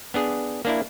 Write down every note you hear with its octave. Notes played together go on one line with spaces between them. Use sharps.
B3 D4 G#4
A#3 D4 E4